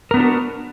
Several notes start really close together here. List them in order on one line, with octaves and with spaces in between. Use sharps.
A#4 B3 D4 F4 F#4